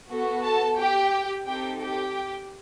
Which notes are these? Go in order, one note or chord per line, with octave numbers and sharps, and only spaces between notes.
B3 F#4 A4
A4 A5
G4 G5
C4 D#4 G4 A4 G5
G4 G5